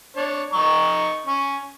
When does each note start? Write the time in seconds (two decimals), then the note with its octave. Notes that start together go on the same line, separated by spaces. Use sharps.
0.17 D4 C#5
0.53 D#4 A#5 C#6
1.26 C#4